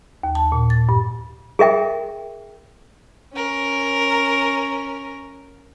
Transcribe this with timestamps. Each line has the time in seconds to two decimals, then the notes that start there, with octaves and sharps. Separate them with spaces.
0.23 D#2
0.35 A5
0.52 A#2
0.70 A6
0.89 G2
1.59 G#4 A#4 E5 G5
3.33 C#4 A#4